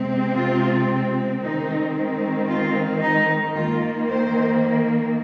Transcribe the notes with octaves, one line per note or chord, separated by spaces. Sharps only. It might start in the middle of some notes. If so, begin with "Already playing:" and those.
Already playing: C3 G#3 C4
F4
D#3 G#3 C4 D#4
F4
D#4
D#3 A#3 F4
C5